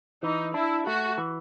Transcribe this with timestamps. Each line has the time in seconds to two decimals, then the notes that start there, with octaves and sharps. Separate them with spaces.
0.23 E3 D#4
0.54 D4 E4
0.86 A3 F#4
1.18 E3